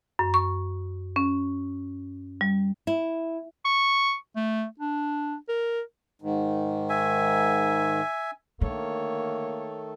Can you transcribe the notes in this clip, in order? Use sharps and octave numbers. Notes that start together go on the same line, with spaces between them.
F#2
C#6
C#4
G3
E4
C#6
A3
D4
A#4
G#2 D#3
E5 G#5
D3 D#3 A3 A#3 A4 C#5